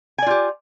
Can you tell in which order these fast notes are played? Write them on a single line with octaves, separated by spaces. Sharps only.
G#5 D5 F4 G4